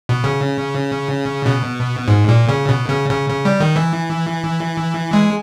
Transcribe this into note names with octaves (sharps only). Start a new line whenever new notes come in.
B2
C#3
B2
G#2
A#2
C#3
B2
C#3
C#3
C#3
G3
D#3
E3
G#3